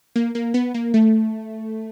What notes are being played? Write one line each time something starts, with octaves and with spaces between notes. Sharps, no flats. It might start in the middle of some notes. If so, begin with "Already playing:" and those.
A#3
A#3
B3
A#3
A3